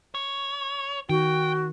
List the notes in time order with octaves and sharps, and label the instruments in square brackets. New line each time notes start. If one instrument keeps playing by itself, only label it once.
[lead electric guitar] C#5
[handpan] D#3 [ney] F#4 [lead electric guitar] G5